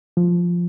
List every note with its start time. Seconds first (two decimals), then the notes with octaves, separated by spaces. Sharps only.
0.17 F3